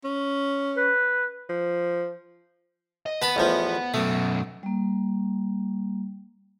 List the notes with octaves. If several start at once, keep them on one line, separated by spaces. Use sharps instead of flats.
C#4
B4
F3
D#5
B3 B4 A5 B5
A1 E2 F3
F#2 B2 A3
G3 A#3